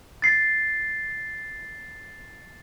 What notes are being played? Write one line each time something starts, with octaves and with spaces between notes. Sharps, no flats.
A6 C7